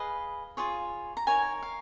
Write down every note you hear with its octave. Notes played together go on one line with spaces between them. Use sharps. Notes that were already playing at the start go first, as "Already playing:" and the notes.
Already playing: G#4 B4 D#5 F5
F4 G#4 C#5
A#5
D#4 A#4 C#5 G#5
F5